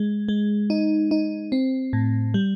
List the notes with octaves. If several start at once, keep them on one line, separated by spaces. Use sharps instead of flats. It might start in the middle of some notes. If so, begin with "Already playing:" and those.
Already playing: G#3
G#3
D#4
D#4
C4
A2
G3